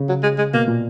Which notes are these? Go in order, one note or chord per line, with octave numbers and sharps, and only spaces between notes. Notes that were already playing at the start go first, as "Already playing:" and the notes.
Already playing: C#3
F#3
G#3
G#3
B2 A#3
A#2